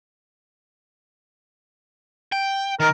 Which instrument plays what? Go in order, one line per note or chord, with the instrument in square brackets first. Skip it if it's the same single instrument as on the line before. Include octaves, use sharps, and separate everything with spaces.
[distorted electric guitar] G5
[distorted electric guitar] D#3 [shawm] A#4